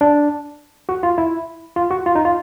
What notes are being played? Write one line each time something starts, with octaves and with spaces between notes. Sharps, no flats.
D4
F#4
F4
E4
F4
F#4
F4
D#4
F4